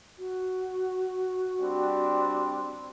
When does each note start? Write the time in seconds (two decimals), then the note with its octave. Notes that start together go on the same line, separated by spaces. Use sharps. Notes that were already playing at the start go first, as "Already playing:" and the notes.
0.19 F#4
1.60 G3 C4 D4